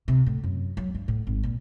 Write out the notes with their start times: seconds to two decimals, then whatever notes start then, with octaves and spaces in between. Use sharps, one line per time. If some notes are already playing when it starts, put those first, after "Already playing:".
0.08 C3
0.26 A2
0.44 F#2
0.77 F#3
0.94 G2
1.08 A2
1.27 G#1
1.43 A#2